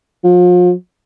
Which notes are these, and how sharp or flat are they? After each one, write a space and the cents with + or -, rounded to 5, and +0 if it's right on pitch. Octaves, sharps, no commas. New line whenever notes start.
F3 +40